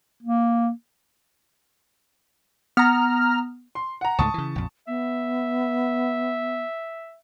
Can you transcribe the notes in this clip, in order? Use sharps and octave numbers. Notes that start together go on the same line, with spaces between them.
A#3
B3 A#5 F6
C6
F#5 A#5
C#2 G#2 A3 A5 C#6 D#6
C#3 E3
A#1 F2
B3 E5